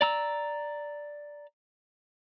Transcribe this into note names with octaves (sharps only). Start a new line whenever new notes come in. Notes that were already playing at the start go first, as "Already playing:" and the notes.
D5 A#5 E6